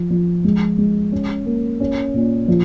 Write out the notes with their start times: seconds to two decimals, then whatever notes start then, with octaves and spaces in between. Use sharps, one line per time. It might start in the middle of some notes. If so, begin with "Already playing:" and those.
Already playing: F3
0.10 F3
0.44 G#3
0.78 G#3
1.12 C#4
1.46 A#3
1.80 C#4
2.14 A#2
2.48 F3